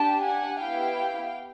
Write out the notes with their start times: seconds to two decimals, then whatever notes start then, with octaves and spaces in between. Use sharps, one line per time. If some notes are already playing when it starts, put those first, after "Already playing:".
Already playing: D4 G4 G5 A5
0.24 F#5 G#5
0.60 B3 E4 G4 F5 G5